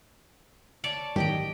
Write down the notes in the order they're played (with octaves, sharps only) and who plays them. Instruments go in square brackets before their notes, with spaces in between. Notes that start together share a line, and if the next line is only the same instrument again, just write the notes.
[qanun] C#5 D5 A5
[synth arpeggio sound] G#2 D#3 F#3 [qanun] G4 D#5 G5